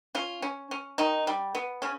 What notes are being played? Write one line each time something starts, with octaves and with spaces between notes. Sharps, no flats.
C#4 F4
C#4
C#4
D#3 D#4
G3
B3
C#3 C#4